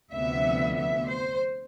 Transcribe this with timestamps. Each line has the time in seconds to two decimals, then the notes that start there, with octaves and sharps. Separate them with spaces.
0.13 D2 C3 F3 B3 E5
0.77 E5
1.08 C5